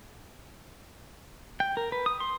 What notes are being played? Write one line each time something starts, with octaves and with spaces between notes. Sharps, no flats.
G5
A#4
B4
D#6
C6